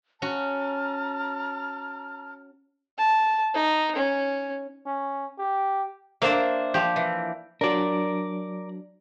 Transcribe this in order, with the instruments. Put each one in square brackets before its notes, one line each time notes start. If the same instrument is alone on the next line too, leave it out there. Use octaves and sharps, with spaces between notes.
[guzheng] C#4 F#4 [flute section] A5 A#5 F6
[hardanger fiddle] A5
D#4
C#4
[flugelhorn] C#4
G4
[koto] A#3 D4 [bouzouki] C5 E5
[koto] F3 G4
[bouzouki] E3
[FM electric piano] F#3 D4 [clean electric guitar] A#4 D5